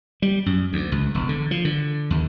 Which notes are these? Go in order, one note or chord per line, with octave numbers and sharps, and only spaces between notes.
G3
F#2
D2
C#2
E1
D3
F3
D3
D#2